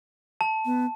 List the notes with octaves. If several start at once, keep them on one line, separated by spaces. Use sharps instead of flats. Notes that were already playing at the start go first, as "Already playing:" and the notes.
A5
B3